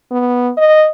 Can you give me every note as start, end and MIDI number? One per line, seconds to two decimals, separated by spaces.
0.11 0.51 59
0.57 0.89 75